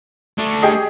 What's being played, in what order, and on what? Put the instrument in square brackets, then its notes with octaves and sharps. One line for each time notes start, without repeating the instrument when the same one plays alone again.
[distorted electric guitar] A3 D4
[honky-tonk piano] G4 G#4 D#5